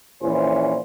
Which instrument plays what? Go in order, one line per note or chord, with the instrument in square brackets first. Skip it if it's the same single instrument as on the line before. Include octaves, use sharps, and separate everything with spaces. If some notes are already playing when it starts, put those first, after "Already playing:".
[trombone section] A#1 E3 C#4 C5